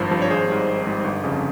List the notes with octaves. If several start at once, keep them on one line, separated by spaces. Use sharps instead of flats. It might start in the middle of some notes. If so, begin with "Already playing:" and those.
Already playing: G#1 G2 F3 C5
G2 F3
C#5
G#1 G#4 C5
G#2 G3
G#1
G#2 G3
G1
F2 C#3